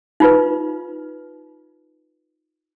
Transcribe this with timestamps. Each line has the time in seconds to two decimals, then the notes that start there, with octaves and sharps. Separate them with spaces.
0.20 D#4 F4 B4